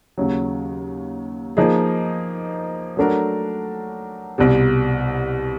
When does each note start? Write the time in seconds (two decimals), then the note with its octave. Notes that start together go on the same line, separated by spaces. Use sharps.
0.18 D#2 C#3 F#3
1.57 F3 A#3 D#4 G#4
2.97 F#3 A3 D4 F#4 A#4
4.38 C2 B2 G3